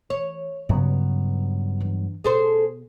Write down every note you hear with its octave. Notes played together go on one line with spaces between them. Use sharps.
E3 C#5
G2 C#3 F#3 B3
E3 D4
B2 B3 G#4 A4 C5